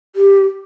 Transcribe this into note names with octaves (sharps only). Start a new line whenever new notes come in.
G4